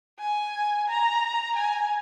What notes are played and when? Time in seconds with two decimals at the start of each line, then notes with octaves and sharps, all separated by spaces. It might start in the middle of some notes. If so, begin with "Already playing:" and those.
0.20 G#5
0.89 A#5
1.56 G#5